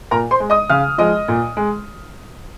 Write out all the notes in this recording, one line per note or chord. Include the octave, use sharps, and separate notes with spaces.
A#2 A#4 A#5
C5 C6
G#3
D#5 D#6
C#3 F5 F6
F3 G#3 D#5 D#6
A#2
G#3